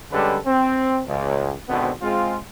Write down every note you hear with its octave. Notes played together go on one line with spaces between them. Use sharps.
D3 G3 G#3 C#4 A4 B4
C4
C#2
G#1 B2 D3 B3 C4
G#3 C4 F4